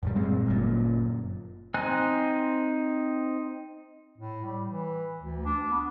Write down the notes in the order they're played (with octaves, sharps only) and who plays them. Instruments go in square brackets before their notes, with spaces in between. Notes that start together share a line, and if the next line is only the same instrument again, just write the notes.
[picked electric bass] F#2 A#2 G3
A#2 G3 G#3 C4
G1 F#2 A#2
[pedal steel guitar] C4 D#4 G#5 F#6
[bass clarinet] A2
G3
E3
D2
D4
B3